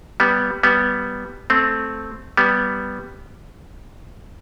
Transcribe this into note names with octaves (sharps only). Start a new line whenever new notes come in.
G3 B3
G3 B3
A3 C4
G3 B3